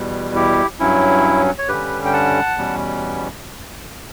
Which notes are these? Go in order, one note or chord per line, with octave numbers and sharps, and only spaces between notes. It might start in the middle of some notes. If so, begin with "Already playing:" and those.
Already playing: E2 B2 G3
E4 G4
G2 F#3 C#4 E4
C#5
G2 D3 G3 C#4 G4 B4
G5
F#5 A5
E2 B2 G3 C#4